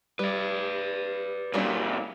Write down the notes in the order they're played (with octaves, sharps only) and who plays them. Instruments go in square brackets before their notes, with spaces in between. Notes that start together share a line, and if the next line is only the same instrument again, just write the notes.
[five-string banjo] G3 [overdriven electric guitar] B4 D5
[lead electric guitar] F#2 A#2 [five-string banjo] G3 C#4 D4